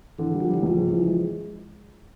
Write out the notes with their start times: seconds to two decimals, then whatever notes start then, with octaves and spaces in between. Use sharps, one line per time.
0.19 D3 E3
0.34 G3
0.40 F3
0.49 E3 G3
0.63 C#2 F3
0.77 C#3
0.92 E3
1.07 G#3